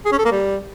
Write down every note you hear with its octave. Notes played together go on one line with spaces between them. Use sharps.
G#4
C#4
A4
A#3
G3